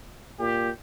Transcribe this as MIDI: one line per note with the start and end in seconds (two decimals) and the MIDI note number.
0.40 0.70 46
0.40 0.71 67